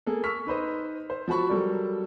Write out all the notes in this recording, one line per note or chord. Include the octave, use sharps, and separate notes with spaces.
A#3 G#4 A4
C#6 E6 F6 B6
D#4 B4 C5 D#5
C5
F3 F#4 A5 B5 C#6
F#3 G3 A4 A#4 D5